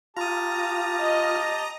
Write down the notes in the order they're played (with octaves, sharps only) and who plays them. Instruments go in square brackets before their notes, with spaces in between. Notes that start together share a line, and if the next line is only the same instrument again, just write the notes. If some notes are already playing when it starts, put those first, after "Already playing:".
[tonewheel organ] F4 [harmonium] G4 A5 [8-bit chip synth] A#5 D#6
[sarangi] D#5